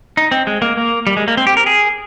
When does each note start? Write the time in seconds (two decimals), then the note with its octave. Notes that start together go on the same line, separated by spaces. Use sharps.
0.17 D#4
0.31 C4
0.47 G#3
0.62 A#3
0.77 A#3
1.07 G3
1.17 G#3
1.28 A#3
1.37 C4
1.47 G4
1.57 A#4
1.66 G#4